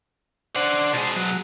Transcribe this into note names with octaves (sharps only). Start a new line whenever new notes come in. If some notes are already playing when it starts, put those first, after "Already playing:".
D4 C5 D5 F#5
B2 G#4 C5 A5
F#3